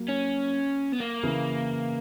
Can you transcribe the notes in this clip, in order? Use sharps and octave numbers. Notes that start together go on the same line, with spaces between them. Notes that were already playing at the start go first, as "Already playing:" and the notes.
Already playing: F#3 A#3
C#4
B3
A#3
C#3 E3